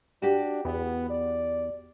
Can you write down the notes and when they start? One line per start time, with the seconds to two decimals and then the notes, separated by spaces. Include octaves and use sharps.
0.22 D4 F#4 G4
0.65 E2 B3
1.10 D5